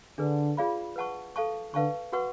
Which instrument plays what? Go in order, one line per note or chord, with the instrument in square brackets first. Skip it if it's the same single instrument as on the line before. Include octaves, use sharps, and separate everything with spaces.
[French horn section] D3 [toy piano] D4 G#4 B4
[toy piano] F4 G#4 D5 F5 B5
B4 F#5 A5 C#6
A4 F5 A5 C#6
[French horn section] D3 [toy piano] B4 F5 A5 C#6
[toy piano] F#4 B4 F#5 C#6